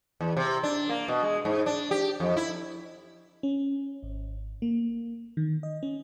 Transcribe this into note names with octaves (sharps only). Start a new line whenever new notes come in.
E2
C3
D4
A#3
B2
G#3
G#2
D4
G4
F2
E4
C#4
G#1
A#3
D#3
D#5
C#4